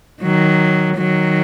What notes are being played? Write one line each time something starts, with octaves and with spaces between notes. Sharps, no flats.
D#3 F#3
D#3 F#3